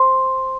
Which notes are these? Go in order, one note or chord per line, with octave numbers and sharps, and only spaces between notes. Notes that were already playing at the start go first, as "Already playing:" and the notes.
Already playing: C5 C6